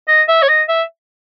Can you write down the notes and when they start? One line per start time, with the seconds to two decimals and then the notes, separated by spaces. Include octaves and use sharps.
0.08 D#5
0.28 E5
0.42 C#5
0.49 D#5
0.69 E5